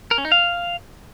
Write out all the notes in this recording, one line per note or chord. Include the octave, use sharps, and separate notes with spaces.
A#4
C#4
D#4
F5